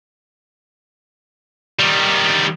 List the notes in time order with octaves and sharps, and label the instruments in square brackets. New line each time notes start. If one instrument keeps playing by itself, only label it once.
[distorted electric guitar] D#3 G3